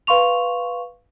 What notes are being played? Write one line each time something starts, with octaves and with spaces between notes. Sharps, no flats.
B4 F5 C6 C#6 F7